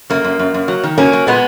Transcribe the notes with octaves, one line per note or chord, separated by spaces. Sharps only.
F#2 A#3
F#2
F#2
F#2
F#3
D#3
F#3 A#3 C#4
F#3
A#2 G#3 B3